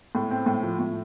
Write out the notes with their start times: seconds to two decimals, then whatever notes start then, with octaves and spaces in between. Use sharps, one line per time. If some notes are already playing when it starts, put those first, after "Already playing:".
0.15 A2
0.31 C4
0.46 A2
0.63 F3
0.79 A2